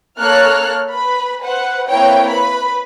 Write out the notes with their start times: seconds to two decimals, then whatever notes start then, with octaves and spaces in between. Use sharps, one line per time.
0.19 A#3 A4 C#5 F6 F#6
0.91 B4 B5
1.40 B4 C5 F#5
1.88 A#3 C4 E4 B4 C#5 G5
2.30 B4 B5